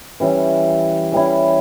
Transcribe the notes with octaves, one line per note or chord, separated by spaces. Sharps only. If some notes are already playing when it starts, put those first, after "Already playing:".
E3 G3 C#4 E4
E3 G3 C#4 E4